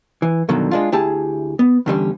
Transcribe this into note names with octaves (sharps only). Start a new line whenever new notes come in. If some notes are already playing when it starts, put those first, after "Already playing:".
E3
G2 B2 D3 D#3 F#3
G#3 D4 F4
D2 E4 G4 G#4 A5
B3
E2 D3 G3 C#4